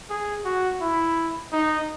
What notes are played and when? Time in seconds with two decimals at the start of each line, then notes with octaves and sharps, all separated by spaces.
0.10 G#4
0.45 F#4
0.81 E4
1.53 D#4